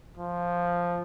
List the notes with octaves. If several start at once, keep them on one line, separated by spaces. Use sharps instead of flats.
F3